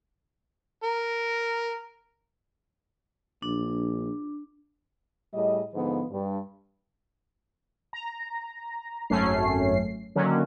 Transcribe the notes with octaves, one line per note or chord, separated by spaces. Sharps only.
A#4
A#1 D4
A2 G3 G#4 D#5
G#2 D3 F3 B3
G2
A#5
G#1 F#2 A3 C#4 C7
D3 D#3 F#3 A#3 C#4